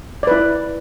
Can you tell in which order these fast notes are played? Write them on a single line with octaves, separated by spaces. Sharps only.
D5 B4 E4